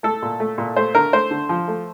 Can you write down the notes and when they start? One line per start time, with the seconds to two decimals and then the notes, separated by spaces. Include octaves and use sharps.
0.03 A3 A4
0.22 A#2
0.40 A3
0.58 A#2
0.76 A3 C5
0.94 D3 A#4
1.13 A3 C5
1.31 D3
1.49 F3
1.68 A3